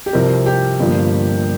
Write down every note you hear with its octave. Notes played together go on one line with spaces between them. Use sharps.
G4
C2 C3 F3 C4 A#4
G4
G1 G2 F3 A#3